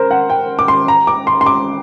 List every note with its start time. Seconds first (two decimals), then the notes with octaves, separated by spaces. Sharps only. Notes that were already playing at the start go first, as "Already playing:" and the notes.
Already playing: A#4 C5
0.11 F#5
0.30 G5
0.59 D6
0.68 C6
0.88 A#5
1.07 D6
1.27 C6
1.41 C6
1.46 D6